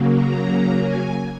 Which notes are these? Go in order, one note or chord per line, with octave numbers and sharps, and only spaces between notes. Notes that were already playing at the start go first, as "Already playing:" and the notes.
Already playing: C#3 F#3 A#3
A#5
G#5